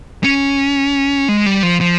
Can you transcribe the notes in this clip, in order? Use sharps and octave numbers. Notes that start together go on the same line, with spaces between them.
C#4
G#3
G3
F3
F3